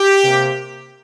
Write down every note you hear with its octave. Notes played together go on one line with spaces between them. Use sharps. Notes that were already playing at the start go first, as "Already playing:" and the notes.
Already playing: G4
C3 A#3